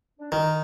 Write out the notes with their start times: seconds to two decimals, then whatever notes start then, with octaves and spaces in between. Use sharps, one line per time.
0.19 D4
0.31 D#3 D#4